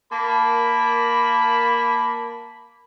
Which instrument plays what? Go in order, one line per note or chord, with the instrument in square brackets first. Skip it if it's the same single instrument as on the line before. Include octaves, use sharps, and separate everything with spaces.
[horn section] A#3 A#4 A5 B5